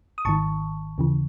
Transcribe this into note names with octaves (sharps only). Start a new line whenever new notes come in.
D#6
G#1 G#2 D#3 A5 C#6
D#2 C#3 E3